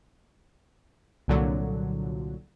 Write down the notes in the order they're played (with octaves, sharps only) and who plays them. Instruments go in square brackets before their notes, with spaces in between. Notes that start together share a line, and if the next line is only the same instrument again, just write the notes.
[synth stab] C2 A#2 D3 F#3